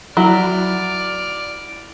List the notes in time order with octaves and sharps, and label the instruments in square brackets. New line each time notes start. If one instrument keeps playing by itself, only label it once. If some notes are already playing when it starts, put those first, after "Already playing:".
[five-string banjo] F#3 [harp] E4 [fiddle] D5 F6